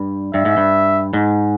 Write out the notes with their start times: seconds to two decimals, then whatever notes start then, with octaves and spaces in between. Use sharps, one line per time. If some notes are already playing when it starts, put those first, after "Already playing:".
Already playing: G2
0.34 G2 E5
0.45 G#2
0.57 G2
1.13 G#2